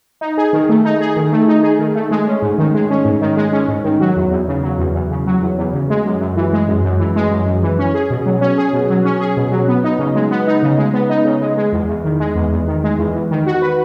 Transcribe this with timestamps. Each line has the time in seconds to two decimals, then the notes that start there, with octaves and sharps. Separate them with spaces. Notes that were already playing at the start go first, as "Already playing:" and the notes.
0.21 D#4
0.38 G#4
0.53 D#3
0.69 A3
0.85 D#4
1.01 G#4
1.16 D#3
1.32 A3
1.48 D#4
1.63 G#4
1.79 D#3
1.95 A3
2.11 G#3
2.27 C#4
2.42 G#2
2.58 D#3
2.75 G#3
2.90 C#4
3.05 G#2
3.21 D#3
3.37 G#3
3.53 C#4
3.68 G#2
3.84 D#3
4.00 F#3
4.16 E2
4.32 E2
4.48 C#3
4.63 F#3
4.79 E2
4.94 E2
5.11 C#3
5.27 F#3
5.42 E2
5.58 E2
5.74 C#3
5.90 G#3
6.06 F#2
6.21 F#2
6.37 E3
6.53 G#3
6.68 F#2
6.84 F#2
7.00 E3
7.16 G#3
7.31 F#2
7.47 F#2
7.63 E3
7.79 C#4
7.94 G#4
8.10 B2
8.26 F#3
8.41 C#4
8.58 G#4
8.73 B2
8.90 F#3
9.05 C#4
9.20 G#4
9.37 B2
9.52 F#3
9.68 B3
9.84 D#4
9.99 C#3
10.15 G#3
10.31 B3
10.47 D#4
10.63 C#3
10.78 G#3
10.94 B3
11.10 D#4
11.25 C#3
11.41 G#3
11.58 G#3
11.73 E2
11.89 E2
12.04 D#3
12.20 G#3
12.36 E2
12.52 E2
12.68 D#3
12.84 G#3
12.98 E2
13.14 E2
13.31 D#3
13.46 F#4
13.62 B4